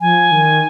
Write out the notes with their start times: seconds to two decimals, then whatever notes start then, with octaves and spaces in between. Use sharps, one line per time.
0.01 F3 G#5
0.32 D#3